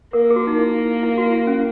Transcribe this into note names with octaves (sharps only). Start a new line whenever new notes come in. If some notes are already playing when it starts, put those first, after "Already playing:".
A#3 A#4
G#4
F#4
D#4
E4
E4
F#4
E4
C#4